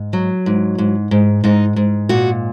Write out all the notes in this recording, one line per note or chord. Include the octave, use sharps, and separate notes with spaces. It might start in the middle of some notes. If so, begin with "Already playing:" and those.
Already playing: G#2
F#3
G#2
G#2
G#2
G#2 D#4
G#2
A#2 F#4